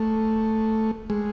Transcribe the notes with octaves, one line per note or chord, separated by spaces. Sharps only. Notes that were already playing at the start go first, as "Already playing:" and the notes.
Already playing: A3
G#3